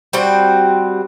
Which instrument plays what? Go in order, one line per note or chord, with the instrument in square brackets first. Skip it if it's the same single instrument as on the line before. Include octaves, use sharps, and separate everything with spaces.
[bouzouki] G3 C4 F#4 G5